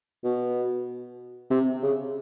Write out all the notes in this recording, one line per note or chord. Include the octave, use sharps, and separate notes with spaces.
B2
C3
C#3